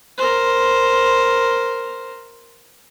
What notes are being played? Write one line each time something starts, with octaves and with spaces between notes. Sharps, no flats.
A#4 C5